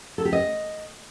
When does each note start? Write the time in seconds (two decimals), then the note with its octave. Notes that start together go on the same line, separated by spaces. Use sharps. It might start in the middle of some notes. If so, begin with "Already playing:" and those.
0.18 A4
0.25 G4
0.33 D#5